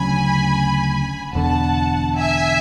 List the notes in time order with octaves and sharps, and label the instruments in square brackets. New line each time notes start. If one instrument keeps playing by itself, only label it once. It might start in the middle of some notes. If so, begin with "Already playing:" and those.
Already playing: [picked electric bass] D2 C#3 F#3 C#4 [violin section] G#5 B5
[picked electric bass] E1 E2 D3 [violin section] F#5 A5
[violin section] E5 G#5